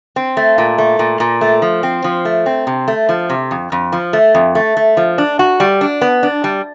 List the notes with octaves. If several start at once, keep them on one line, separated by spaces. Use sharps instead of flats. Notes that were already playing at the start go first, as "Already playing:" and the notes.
C4
A3
A#2
A3
A#2
A#2
A3
F3
C4
F3
A3
C4
C3
A3
F3
C3
F2
F2
F3
A3
F2
A3
A3
F3
D4
F#4
G3
D4
B3
D4
G3